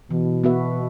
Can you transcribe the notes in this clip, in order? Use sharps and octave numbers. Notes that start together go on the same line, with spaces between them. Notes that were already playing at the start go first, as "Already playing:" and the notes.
B2 E3
B3 F#4 B4 E5